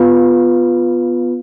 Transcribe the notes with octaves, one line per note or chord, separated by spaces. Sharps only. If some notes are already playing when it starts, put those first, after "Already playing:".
Already playing: B3 F4 B4